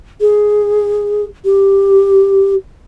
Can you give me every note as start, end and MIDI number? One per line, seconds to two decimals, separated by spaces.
0.21 1.25 68
1.45 2.54 67